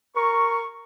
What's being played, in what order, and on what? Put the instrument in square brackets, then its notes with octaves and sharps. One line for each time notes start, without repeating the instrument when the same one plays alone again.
[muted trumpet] A#4 [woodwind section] C#6